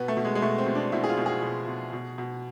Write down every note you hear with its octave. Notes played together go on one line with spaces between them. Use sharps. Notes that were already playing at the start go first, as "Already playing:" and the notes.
Already playing: B2 B3
A3
B2
G#3
G#3
B2 A3
C4
B2
D4
B2 E4
G#4
F4
B2
G#4
B2
B2
B2
B2